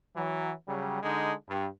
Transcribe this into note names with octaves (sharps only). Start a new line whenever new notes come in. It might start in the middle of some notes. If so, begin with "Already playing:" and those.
E3 F#3
C#3 F#3 G3
D3 G#3 D4 D#4
G2